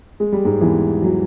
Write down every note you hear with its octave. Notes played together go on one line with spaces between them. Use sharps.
G#3
G3
G#2 G#3
E2 E3
F#3